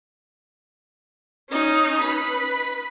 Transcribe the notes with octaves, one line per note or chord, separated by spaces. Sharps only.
C#4 D#4
B4 B5